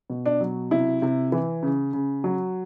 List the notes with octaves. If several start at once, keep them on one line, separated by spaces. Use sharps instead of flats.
B2
D4
F#3
C3 E4
C3
E3
C#3
C#3
F#3